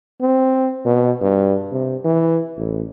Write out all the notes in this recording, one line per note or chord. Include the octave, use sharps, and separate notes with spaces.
C4
B2
G2
C3
E3
A1